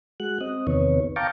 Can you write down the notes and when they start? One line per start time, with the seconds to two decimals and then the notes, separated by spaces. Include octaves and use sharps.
0.20 G#3 F#4 F#6
0.41 C4 D#5
0.67 E2 C3 D#3 B3 C#5
1.16 F5 G5 A5 A#5 C#6 D6